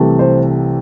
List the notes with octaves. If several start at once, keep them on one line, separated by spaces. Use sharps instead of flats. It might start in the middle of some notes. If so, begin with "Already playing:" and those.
Already playing: C2 C3 E3 A3
C5